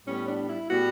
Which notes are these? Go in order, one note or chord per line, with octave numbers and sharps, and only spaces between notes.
A2 G3 B3 C#4
D4
E4
A2 G3 B3 F#4